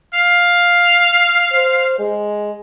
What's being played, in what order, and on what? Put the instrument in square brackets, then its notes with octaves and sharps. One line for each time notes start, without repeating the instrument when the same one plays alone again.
[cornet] F5
[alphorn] C5
G#3